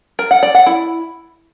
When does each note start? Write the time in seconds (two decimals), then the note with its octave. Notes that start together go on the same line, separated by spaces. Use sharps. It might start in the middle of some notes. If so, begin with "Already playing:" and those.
0.19 A#4
0.31 F#5
0.43 D5
0.54 F#5
0.66 E4